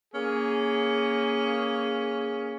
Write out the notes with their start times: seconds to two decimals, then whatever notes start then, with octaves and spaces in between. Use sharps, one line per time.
0.13 A#3 C#4 G#4